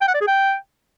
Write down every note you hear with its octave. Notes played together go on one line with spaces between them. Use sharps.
G5
F#5
D5
G#4
G5